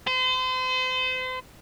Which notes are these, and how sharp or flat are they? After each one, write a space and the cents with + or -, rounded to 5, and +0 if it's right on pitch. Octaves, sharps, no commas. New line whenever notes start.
C5 -35